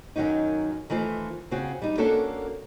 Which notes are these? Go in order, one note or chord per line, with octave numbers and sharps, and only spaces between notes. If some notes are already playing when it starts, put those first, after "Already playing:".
F#2 D#3 F#3 C#4 D#4
D#3 E3 A3 F4 C5
C#3 C4 F#4
G3 D#4
A#3 C#4 D4 F#4 A4